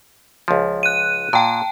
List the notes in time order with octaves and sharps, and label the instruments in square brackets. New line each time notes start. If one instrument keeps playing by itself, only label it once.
[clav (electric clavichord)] C#2 F3
[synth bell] F#6 D#7
[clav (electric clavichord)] A#2 [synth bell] G5 A5